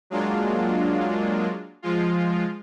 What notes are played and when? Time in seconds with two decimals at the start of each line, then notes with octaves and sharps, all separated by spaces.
0.10 F#3 G#3 A#3 D4 F4
1.82 F3 G#3 F4